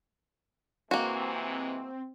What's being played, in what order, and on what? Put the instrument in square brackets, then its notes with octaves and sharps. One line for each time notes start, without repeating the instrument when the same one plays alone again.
[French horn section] C3 E3 G#3 [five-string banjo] A#3 F#4 [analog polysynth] C4